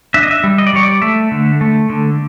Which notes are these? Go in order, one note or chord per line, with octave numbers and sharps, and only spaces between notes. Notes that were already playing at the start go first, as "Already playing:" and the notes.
D4 E5
D#5
E5
G3
D#5
D5
G3 C#5
D5
A3 E5
D3
A3
D3